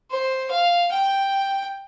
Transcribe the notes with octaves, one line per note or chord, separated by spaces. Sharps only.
C5
F5
G5